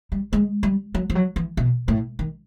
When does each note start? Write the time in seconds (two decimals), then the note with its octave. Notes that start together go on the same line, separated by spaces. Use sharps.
0.12 G3
0.33 G#3
0.63 G3
0.95 F#3
1.10 F3
1.15 F#3
1.36 E3
1.57 B2
1.88 A2
2.19 D#3